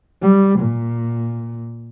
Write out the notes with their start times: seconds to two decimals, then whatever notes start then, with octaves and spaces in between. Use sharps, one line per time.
0.22 G3
0.60 A#2